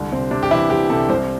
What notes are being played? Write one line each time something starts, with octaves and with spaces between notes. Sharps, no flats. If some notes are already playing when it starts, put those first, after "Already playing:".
Already playing: C2 D3
C3 C4
C3 D4
G4
E3 E4
E3 G4
C3 A4
C2 C5